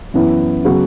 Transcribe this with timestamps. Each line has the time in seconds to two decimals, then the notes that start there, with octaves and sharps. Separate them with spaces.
0.14 F#2 E3 B3 E4
0.64 C#3 F#3 B3 F#4